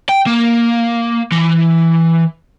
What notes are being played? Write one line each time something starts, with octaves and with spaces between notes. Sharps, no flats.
G5
A#3
E3